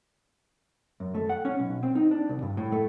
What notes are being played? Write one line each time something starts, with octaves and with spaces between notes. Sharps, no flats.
F#2
A3
F#5
C#4
B1
C4
D#4
D4
C2
G2
A2
A3